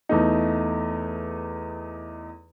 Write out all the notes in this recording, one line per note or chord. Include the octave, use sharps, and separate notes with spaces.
E2 A3 D#4